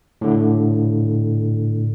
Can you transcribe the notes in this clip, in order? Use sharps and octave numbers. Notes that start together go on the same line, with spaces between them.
A2 D3